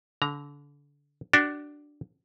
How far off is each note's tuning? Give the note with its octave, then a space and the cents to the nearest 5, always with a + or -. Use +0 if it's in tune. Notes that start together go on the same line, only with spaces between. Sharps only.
D3 -30 A#5 +10
D4 +0 F#4 +35